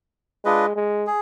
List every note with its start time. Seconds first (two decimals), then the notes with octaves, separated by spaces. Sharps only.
0.44 G#3 D4 F4 B4 D#5
0.76 G#3
1.07 G#4